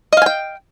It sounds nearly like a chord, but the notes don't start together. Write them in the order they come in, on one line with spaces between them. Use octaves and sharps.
D#5 F5 G#5 G5